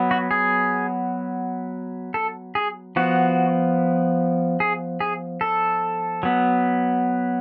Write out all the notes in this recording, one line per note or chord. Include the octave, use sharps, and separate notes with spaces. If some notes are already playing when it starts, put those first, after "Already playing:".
Already playing: F#3 B3
F#4
G#4
A4
G#4
F3 B3 F#4
G#4
G#4
A4
F#3 B3